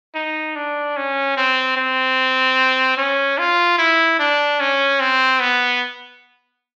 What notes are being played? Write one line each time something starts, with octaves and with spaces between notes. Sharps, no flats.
D#4
D4
C#4
C4
C4
C#4
F4
E4
D4
C#4
C4
B3